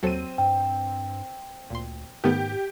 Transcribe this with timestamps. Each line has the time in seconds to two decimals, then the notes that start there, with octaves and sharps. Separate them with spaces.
0.03 D#2 F#3 C4 A4 D#7
0.38 G2 G5
1.70 D2 A#2 C6
2.24 G#2 D#3 A3 B3 G4